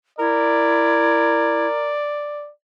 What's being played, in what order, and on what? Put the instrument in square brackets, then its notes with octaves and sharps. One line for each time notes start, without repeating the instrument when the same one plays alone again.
[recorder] E4 [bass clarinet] A#4 [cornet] D5